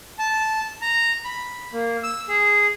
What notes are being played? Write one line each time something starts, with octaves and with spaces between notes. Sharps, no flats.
A5
A#5
B5
A#3
E6
G#4